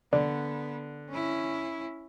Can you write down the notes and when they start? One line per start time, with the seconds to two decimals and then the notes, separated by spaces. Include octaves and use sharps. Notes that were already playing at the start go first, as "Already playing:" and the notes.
0.13 D3 B3 D5
1.09 C#4 E4